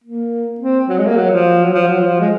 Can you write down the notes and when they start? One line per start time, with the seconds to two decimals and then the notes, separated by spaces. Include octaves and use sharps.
0.04 A#3
0.60 C4
0.88 F#3
0.98 G#3
1.07 A#3
1.16 F#3
1.31 F3
1.63 F#3
1.73 F3
1.87 F#3
2.01 F3
2.20 G#3